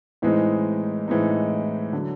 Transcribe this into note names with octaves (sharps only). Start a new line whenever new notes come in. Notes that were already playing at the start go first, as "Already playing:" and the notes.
A2 E3 G#3 C4 D#4
A2 E3 G#3 C4 D#4
D3 F#3